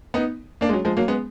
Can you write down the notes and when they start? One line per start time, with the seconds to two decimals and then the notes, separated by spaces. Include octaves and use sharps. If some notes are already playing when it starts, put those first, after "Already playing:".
0.14 B3 D#4
0.61 A#3 D4
0.69 G#3
0.73 F#3
0.85 F3 G#3
0.97 F#3 A#3
1.08 G#3 B3